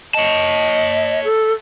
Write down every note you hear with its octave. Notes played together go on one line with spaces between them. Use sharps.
C#5 D#5 A5
A4